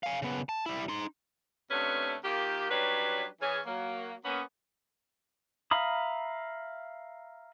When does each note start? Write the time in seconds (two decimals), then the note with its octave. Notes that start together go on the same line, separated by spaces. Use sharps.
0.03 F5 G#5
0.22 C#3 B3
0.49 A5
0.66 G3 E4
0.88 D#4 C6
1.71 C3 A3 B3 C#4 D4 B4
2.23 D#3 A#3 F4 G4
2.70 F#3 G3 C#4 D4 B4
3.41 E3 C#4 G#4
3.66 F#3 A#3
4.25 A#3 B3 C#4
5.71 E5 F5 A#5 B5 D#6